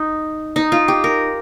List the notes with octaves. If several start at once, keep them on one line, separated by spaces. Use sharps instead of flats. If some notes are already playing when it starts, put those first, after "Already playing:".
Already playing: D#4
D#4
F4
G4
A#4